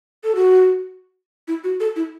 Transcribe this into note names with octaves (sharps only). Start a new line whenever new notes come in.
A4
F#4
E4
F#4
A4
E4